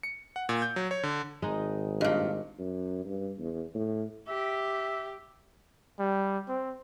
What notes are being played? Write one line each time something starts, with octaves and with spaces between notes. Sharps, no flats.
C#7
F#5
A#2
G6
F#3
C#5
D3
G#1 G#3 D#4
G2 A#2 G4 D#5
F#2
G2
E2
A2
G4 E5
G3
C4